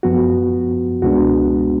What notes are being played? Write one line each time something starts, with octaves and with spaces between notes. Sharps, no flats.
F#2 F3 B3 F#4
C#2 B2 G#3 B3 D4 F#4